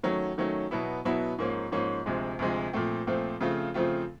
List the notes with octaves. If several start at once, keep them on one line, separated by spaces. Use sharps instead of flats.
D#3 F#3 A3 C#4
D#3 F#3 A3 C#4
B2 F#3 B3 E4
B2 F#3 B3 E4
G#2 F3 A#3 C#4
G#2 F3 A#3 C#4
D2 C3 F3 G#3
D2 C3 F3 G#3
A#2 F3 A3 C4
A#2 F3 A3 C4
C#3 F3 A3 C4 F4
C#3 F3 A3 C4 F4